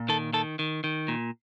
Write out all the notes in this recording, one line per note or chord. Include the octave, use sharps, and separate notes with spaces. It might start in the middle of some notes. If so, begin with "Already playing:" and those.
Already playing: A#2
D#3 A4
D#3 A4
D#3
D#3
A#2